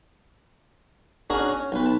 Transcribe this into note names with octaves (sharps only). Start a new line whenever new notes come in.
C#4 D4 F#4 G#4 A#4
C#4
B1 B4
A5